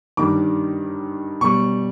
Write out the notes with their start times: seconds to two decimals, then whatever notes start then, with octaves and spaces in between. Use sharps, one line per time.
0.17 G2 D#3 G3 D6
1.41 B2 G3 C#6